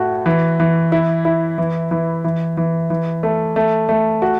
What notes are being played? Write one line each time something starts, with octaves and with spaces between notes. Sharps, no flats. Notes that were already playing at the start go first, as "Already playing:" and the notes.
Already playing: A2 A3 F#4
E3
E3
E4
E4
E3
E3
E3
E3
E3
A3
A3
A3
F#4